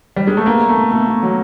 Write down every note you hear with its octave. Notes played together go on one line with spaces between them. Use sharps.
G3
G#3
A3
A#3 B3
B3
A3
B2
B2 A3
B2
F#3